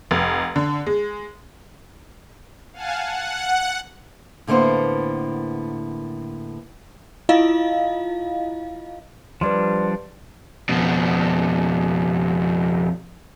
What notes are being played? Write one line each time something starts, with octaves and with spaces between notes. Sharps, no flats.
F1
D3
G#3
F5 F#5 G#5 A5
F#5
A2 D3 A#3 B3 C5
E4 F4 D#5 F5
F3 G3 D4 B4 D5 C6
F2 B2